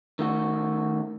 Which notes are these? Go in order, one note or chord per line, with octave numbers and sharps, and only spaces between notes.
D#3 A3 F#4